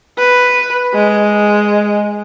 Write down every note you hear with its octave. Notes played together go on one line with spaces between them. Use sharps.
B4
G#3